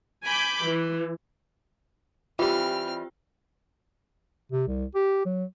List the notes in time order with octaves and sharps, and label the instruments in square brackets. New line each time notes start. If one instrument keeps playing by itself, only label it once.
[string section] G#5 B5 D6 G6
E3
[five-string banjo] E3 G3 [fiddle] C4 F6 [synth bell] F4 G4
[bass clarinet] C3
C2
G4
F#3